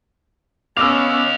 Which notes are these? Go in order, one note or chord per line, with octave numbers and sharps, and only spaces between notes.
B3 C#4 D#5 F5 D6 E6